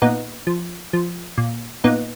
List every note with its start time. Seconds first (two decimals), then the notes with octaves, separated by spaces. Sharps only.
0.02 A#2 B3 D#4
0.47 F3
0.93 F3
1.38 A#2
1.84 A#2 B3 D#4